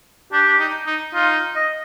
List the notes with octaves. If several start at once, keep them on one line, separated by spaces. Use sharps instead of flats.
D4 G4
D4
D#4
D#4
D#4 F4
D#5